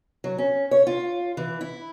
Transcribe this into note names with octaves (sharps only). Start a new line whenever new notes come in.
F#3
C#4
C#5
F4
E3
E4